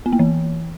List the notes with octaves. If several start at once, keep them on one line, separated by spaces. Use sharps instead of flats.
B3
A#3
E3